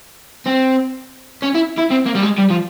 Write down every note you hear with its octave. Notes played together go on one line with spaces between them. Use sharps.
C4
C#4
E4
E4
C4
A#3
G3
G#3
G3
F3